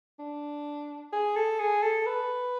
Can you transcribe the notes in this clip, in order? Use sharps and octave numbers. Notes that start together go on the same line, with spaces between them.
D4
G#4
A4
G#4
A4
B4